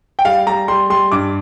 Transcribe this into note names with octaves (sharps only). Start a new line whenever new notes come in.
G5
G3 F5
G3 A#5
G3 C6
G3 C6
G2 D6